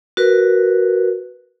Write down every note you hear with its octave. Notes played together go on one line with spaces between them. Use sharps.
F#4 A#4 B4